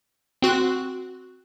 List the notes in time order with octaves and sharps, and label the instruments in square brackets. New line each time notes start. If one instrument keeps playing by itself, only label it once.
[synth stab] C4 F#4 F#6